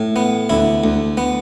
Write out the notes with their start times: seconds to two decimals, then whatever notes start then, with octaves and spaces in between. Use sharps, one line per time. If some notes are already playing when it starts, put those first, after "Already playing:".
Already playing: A2
0.16 B3
0.49 D2 E4
0.84 D2
1.17 B3